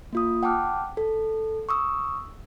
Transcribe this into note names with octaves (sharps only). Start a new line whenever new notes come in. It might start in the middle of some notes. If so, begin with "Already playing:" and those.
A#3 F4 D#6
F#5 G5 A5 D6 F6 F#6
A4
C#6 D#6 E6